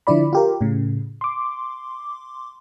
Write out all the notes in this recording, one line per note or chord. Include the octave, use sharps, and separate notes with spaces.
D3 F3 E4 D5 B5
F4 G4 A#4
A2 C#3
C6 D6